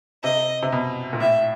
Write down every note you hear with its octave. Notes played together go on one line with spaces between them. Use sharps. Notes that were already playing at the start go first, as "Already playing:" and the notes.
C3 D#5
C3
B2
A#2
A2 E5